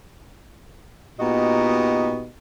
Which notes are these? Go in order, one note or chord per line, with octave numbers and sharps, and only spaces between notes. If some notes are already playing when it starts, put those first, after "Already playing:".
A#2 B3 D#4 F#4 G4 D#5